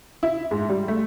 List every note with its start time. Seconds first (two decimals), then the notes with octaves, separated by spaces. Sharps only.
0.23 E4
0.51 G#2
0.69 G3
0.88 A3